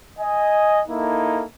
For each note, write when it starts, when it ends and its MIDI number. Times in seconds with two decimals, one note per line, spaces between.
0.20 0.81 75
0.20 0.81 80
0.88 1.43 58
0.88 1.43 63
0.88 1.43 64
0.88 1.43 69